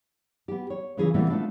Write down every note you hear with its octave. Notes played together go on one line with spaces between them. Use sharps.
B3 G4
C#5
C#3 E3 C#4 F4 G#4
A2 C3 E3 G3 A#3 B3
G#3 A3 B3 C4 D4 F4